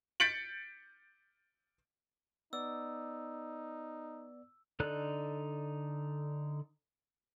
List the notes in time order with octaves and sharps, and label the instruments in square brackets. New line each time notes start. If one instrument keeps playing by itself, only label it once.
[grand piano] G6 A6 B6 C#7 D7 F#7
[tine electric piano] B3 D5 [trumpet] D#4 [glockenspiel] E6
[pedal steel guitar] D3 D#4 A4 D5 F#6